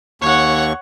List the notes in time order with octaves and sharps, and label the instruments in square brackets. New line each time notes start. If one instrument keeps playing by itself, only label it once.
[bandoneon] D#2 C#6 [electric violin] C#5 F#5